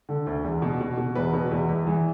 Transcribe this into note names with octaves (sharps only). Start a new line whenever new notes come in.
D3
D2
E2
B2
B2
B2
E2 B4
B2
E2
E2
E3